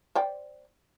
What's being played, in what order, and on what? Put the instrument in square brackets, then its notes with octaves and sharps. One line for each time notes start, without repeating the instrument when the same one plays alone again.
[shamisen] C5 D5 G5